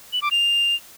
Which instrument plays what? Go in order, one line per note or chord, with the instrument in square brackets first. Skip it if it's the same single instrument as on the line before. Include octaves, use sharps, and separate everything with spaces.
[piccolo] F#7
D6
F7